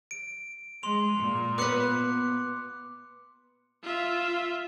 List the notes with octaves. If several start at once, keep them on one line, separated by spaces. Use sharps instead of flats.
D7
G#3 C6 F7
A#2
B3 B4 D6 F#6 C#7
F4 E5